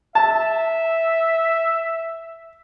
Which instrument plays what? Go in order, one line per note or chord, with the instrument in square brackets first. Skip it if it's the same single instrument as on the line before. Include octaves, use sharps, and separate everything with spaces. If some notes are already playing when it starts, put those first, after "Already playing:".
[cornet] E5 [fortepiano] A5